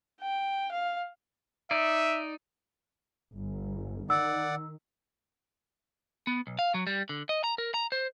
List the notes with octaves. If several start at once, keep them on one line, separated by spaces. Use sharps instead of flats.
G5
F5
D#4 D5 E5
G1
D#3 D5 F#5 D6 E6
B3
B1
F5
F#3
G3
D3
D#5
A#5
A#4
A#5
C5